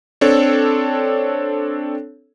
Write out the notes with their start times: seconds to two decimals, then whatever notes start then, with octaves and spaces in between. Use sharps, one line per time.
0.21 C4 D4 A4 C#5